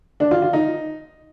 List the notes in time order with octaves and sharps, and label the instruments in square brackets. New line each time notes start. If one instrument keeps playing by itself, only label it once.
[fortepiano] D4
F4
F4
D#4